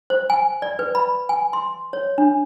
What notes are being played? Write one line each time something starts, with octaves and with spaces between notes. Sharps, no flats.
C5
G#5
D5
B4
B5
G#5
C6
C#5
D4